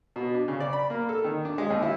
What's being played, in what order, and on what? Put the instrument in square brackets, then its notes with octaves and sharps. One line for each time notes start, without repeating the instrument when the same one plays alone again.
[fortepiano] B2
D4
C#3
D5
B5
A#3
A4
D#3
D4
G#3
D#2
E4